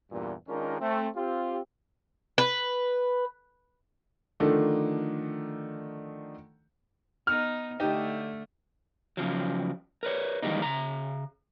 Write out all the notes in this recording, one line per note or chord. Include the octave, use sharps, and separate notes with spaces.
E2 G2 A#2
D#3 G#3 C#4 D4 F4 A#4
A3 C4
C4 F4 G4
B4
D3 D#3 F3 A3 D4 D#4
B3 D#4 F6
D3 A3 D#4 G4
C#3 F3 F#3
A#4 B4 C#5
D#3 E3 G3 G#3 A#3 D#4
C#3 A#5